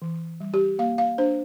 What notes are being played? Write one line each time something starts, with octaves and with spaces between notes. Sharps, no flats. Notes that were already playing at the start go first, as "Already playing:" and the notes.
E3
G3
G4
A#3 F5
F5
D4 C5